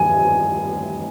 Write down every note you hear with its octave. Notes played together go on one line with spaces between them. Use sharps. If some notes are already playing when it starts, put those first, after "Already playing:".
Already playing: G#5